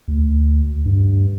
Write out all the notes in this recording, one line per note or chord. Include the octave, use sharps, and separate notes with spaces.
D2
G2